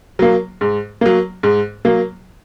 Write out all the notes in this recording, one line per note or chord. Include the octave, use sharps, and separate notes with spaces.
F#3 A#3
G#2
F#3 A#3
G#2
F#3 A#3